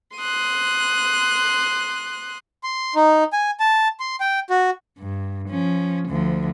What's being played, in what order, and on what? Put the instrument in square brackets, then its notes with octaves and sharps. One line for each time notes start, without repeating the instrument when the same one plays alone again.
[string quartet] C6 D#6 F#6
[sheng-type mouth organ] C6
D#4
G#5
A5
C6
G5
F#4
[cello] G2
F3 C#4
D2 F3